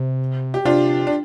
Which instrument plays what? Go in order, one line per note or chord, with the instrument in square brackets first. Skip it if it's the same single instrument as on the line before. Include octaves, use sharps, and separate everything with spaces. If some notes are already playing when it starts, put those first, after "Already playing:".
Already playing: [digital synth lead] C3
[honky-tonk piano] G4
[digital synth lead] C3 [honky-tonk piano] D4 F4
[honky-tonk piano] D4